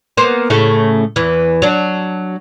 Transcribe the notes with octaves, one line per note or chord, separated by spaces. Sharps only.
A#3 B3 C5
A2 C#3 A3
E2 E3
F#3 D4